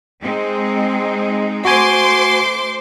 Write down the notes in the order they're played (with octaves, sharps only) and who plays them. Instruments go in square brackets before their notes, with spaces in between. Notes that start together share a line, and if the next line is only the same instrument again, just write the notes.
[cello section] G#3 C4 D#4
[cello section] A3 C5 [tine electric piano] F#4 G#5 [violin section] C6 D6